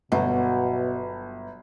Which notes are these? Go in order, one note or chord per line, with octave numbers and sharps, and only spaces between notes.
G1 B2 F#3